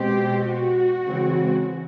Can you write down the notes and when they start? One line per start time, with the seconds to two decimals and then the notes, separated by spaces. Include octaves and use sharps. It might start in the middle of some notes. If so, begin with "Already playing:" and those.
Already playing: B2 G#3 C4 G4
0.47 F#4
1.04 C#3 E3 G#3 C4